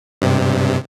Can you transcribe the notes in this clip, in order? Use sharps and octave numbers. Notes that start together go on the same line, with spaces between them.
G2 C3